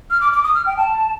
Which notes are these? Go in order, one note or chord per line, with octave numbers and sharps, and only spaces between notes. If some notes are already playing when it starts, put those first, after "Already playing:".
F6
D6
D6
D#6
F6
G5
A5